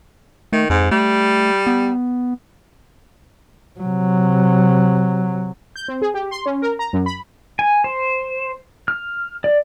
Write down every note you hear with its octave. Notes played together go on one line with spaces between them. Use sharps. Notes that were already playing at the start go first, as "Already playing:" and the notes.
D#3 A3
F2 G#2
G3 A3
B3
C3 F#3
G6
C4
G#4
G4
C6
C#4
A#4
A#5
F#2
B5
G#5
C5
F6
D5